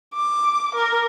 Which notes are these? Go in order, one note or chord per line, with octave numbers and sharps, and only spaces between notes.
D6
A#4